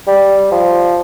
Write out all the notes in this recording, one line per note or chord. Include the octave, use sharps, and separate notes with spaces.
G3
F3